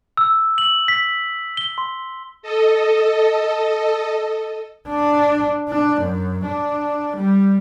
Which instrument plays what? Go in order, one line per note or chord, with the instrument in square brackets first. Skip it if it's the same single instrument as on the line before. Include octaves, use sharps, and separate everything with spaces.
[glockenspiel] E6
F#7
B6
G7
C6
[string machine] A4 D#5
[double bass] D4
D4
F#2
D4
G3